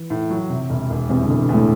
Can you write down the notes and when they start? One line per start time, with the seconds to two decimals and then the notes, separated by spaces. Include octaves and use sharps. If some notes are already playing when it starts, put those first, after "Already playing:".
Already playing: E3
0.10 A2
0.30 F#3
0.50 C3
0.70 E1
0.90 E1
1.09 E2 C3
1.24 D3
1.30 E1
1.49 E2
1.54 A2